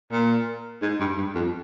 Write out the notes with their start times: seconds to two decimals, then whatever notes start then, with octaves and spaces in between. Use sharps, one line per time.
0.12 A#2
0.82 G#2
1.00 G2
1.17 G2
1.35 F2